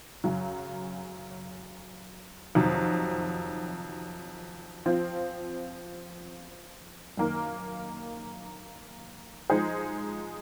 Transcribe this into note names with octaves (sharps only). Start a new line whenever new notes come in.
F#2 C#3 F#3
F2 C3 D#3 F#3
F3 C4 F4
F#2 D#3 A#3 D#4 A#4
F3 G#3 D#4 G#4 C5